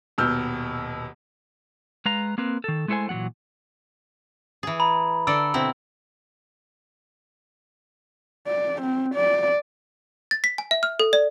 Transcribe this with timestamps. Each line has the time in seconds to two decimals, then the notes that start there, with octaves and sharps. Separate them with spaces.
0.18 D#1 B2 E6 F6 G6
2.05 G#3 B4 F5 A#5
2.38 A#3 C4 A#4 B4
2.64 D#3 A4
2.88 G#3 A3 E4 A4 C5 G#5
3.09 A#2 E3 F#3 G#3 F#5
4.63 E3 G#4
4.80 A#5 B5
5.27 D3 A4 D5 E6
5.54 B2 C4 E4
8.47 D5
8.82 C4
9.15 D5
10.31 A6
10.44 B6
10.58 G#5
10.71 E5
10.83 F6
11.00 A4
11.13 D5